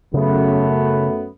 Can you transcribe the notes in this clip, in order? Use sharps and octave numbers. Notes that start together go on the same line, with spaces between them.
F#2 C#3 A3 B3